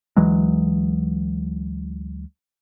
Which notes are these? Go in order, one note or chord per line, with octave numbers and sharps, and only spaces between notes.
D2 E3 F#3 G#3